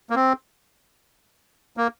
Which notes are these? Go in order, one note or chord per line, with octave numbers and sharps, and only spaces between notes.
A#3
C4
A#3